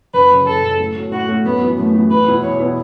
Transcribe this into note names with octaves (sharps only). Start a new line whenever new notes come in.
F#1 B4
F#2 C#3
F#1 A4
F#2 C#3
A2
A3 C#4 F#4
A2 F#4
A3 C#4 F#4
F#2 B3
E3 B3 F#4
F#2 A3
E3 B3 F#4
E2 B4
B2 B3 E4 B4
E2 C#5
B2 B3 E4 B4